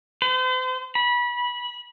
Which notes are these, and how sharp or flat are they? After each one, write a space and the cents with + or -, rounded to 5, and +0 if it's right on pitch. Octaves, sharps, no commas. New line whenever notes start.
C5 -40
B5 -25